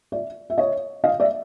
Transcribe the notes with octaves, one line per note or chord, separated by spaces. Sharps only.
D5 E5
E5
C#5 D#5
D#5 F5
D5 E5